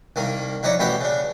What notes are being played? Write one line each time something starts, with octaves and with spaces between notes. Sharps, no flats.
C2 D#3 A#3
F2 D#4 E4 C#5 D5 C#6
A1 B2 E4 F#4 G4 G5
C#3 D4